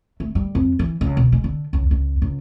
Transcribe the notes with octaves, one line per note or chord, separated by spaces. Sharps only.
A3
G3
F2
E3
C#2
B2
G#3
D3
C#2
C#2
C#2